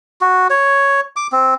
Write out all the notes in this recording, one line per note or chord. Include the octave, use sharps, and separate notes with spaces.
F#4
C#5
D6
C4